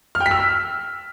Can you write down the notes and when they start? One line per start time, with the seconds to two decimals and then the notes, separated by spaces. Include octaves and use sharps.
0.15 F6
0.20 G5
0.26 B6
0.31 E6